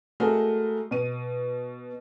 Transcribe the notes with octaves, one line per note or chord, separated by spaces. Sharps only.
G#3 A3 F#4 G#4 A#4
B2 D#7